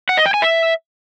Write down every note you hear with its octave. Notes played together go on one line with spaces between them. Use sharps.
F#5
D#5
G5
G#5
E5